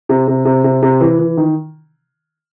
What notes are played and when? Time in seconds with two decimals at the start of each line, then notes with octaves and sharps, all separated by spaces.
0.09 C3
0.28 C3
0.45 C3
0.64 C3
0.82 C3
1.00 E3
1.19 E3
1.37 D#3